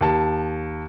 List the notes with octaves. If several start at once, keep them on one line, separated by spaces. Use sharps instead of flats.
D#2 A5